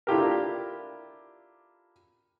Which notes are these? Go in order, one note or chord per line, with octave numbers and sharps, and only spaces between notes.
D4 E4 F4 G4 A4 A#4